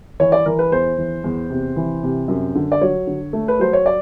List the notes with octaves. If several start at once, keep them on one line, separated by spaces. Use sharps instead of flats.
E3 C#5
D5
E3 A#4
B4
E2 C5
E3
E2
C3
E3
C3
F#2
D3
D5
F#3 C#5
D3
A3
B4
F#3 C5
C#5
D5